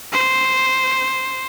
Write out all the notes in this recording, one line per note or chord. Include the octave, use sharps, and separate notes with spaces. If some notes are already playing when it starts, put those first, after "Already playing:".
C5